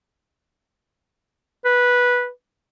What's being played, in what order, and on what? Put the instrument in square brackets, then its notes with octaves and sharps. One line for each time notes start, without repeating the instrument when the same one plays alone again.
[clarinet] B4